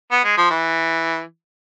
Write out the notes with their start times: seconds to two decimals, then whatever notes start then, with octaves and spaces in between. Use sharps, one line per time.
0.11 B3
0.24 G#3
0.37 F3
0.50 E3